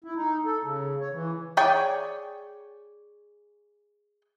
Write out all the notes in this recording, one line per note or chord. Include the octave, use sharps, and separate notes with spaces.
E4
D#4
A4
C#3
C#5
E3
G#4 C#5 D5 G5 G#5